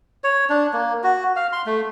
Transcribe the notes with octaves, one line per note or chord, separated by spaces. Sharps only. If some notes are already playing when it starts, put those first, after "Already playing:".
C#5
D4
A#3
F#4
F5
C6
A3